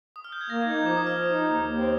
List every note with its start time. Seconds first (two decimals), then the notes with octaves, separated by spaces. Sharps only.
0.16 D#6
0.24 F6
0.32 G6
0.41 G#6
0.50 A#3 A#6
0.62 G#6
0.66 D#4
0.73 G#6
0.82 F3 D6
0.97 F3 D#6
1.06 F6
1.13 F3 D#6
1.29 D#4
1.45 D#2
1.61 D#2
1.76 C4